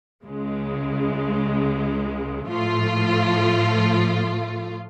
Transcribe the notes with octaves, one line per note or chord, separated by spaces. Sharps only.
C#2 C#3 G#3
A2 F3 A3 F4